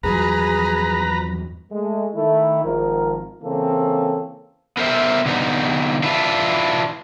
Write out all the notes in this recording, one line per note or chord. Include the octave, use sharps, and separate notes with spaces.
E2 G2 F3 F#3 G#4 B4 A#5
G#3 A3
D#3 A3 E4
G#1 F3 A#4
C#3 E3 A#3 C4 C#4 A4
B3 A#4 C5 E5
D3 B3 D#4
D4 E4 F4 B4